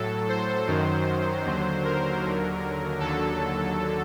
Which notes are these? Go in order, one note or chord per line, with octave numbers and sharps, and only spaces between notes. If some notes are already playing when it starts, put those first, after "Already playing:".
Already playing: A2 F#3 A4
C5
F#2 D#3 F#3
D#2 D3 F#3
A#4
D#2 D3 F#3
D#2 D3 F#3 A4